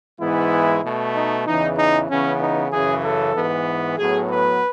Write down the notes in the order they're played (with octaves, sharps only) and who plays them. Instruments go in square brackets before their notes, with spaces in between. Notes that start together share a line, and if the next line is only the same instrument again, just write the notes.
[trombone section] G#2 E3 G#3 B3 E4
B2 A3
D#4
E2 C#3 E3 D#4
D#4
C#3 E3 B3 C#4
D#4
F#2 C#3 E3 G#4
A4
G#2 E3 B3
A2 F#3 B3 G#4
B4